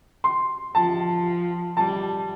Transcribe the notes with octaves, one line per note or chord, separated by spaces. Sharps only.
C6
F3 A5
G3 A5